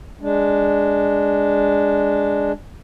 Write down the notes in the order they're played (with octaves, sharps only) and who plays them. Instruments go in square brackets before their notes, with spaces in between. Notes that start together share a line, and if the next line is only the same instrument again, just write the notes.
[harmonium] G#3 D4